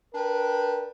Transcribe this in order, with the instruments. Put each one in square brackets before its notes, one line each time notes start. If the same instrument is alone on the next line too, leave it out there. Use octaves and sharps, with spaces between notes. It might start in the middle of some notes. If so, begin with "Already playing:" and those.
[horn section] D4 A#4 B4 G5